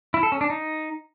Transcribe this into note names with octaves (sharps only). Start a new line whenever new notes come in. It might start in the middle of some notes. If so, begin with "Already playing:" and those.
E4
A4
C#4
D4
D#4